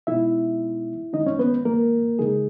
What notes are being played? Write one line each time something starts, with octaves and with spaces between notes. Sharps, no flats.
B2 G#3 B3 D#4 E4 E5
D#3 G#3 C#4 D#4 D#5
C#4 C#5
B3 B4
A#3 A#4
C#3 G#3 D#4 G#4